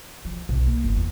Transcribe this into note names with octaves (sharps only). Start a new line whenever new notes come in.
F3
B1
A#3
G1
E2